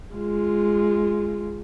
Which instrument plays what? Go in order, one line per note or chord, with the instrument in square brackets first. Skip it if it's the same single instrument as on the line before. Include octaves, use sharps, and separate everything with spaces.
[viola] G#3 F4